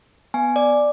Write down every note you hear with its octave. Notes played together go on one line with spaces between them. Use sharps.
B3 G#5
D5